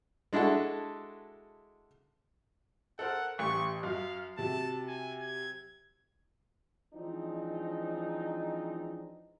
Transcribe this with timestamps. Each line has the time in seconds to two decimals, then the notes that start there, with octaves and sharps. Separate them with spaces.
0.33 G#3 D4 E4 F#4 A4
2.99 A4 A#4 C5 F#5
3.39 A1 G4 C#6
3.83 F#2 F5
4.38 C3 F#3 A5
4.88 G#5
5.21 G#6
6.94 E3 F3 G#3 C4 D4 D#4